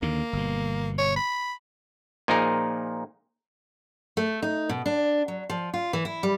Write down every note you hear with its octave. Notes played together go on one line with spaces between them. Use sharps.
D#2 D3 A#3
G1 B2
C#5
B5
A#2 F3 D#4 G#4 A#4
A3
D#4
B2
D4
F#3
F3
F4
E3
E4
G3